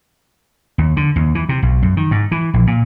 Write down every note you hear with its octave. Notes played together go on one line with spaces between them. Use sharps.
D#2
D3
D#2
E3
C3
B1
F#2
D#3
G#2
E3
A#1
A#2